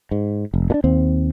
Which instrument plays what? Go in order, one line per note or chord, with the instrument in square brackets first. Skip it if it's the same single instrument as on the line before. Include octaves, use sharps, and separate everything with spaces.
[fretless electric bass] G#2
F1
A#2 D4
D#2 C4